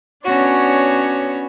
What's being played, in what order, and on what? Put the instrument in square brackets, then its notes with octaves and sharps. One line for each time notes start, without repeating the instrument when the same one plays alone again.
[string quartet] B3 C#4 D4 F#4 C#5